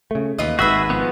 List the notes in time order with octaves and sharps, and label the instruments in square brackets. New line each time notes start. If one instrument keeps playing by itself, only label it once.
[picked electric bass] C#3 A3
[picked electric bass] D#2 [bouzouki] E3 F4 D#5
[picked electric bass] G#1 G#2 [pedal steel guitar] F#4 E5 [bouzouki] G#4 B4
[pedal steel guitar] F3 B3